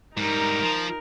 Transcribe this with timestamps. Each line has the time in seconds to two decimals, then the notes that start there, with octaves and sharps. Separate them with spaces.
0.17 G#2 G3 D#4 A#4
0.63 F3